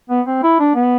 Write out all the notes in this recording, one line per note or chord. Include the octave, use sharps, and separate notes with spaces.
B3
C4
E4
D4
B3